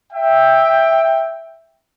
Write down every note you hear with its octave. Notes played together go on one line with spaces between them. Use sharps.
E5 G5